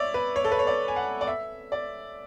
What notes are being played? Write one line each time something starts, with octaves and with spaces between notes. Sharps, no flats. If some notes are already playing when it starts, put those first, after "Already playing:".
Already playing: C#5 D5 E5
B4
C#5
A4
B4
C#5
D5
G#5
F#5
D5
E5
D5